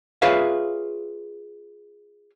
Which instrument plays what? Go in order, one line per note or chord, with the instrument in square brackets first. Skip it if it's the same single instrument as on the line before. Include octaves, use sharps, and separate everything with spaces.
[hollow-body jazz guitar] F4 G#4 B4 C#5 E5 F5